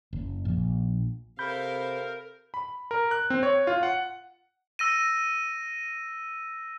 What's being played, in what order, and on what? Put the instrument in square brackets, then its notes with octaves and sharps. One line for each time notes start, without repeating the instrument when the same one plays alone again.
[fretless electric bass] F#1
A#1
[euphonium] C3 [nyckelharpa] A4 F5 [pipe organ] A#4 [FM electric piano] B5 G6
[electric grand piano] B5
A#4
F#6
C4
C#5
F4
F#5
[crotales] E6 A#6 D#7